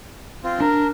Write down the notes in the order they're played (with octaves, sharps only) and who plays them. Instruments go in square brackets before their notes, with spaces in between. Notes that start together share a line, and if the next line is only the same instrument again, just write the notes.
[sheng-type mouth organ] C4 F4
[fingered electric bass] D4 [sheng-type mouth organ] A#4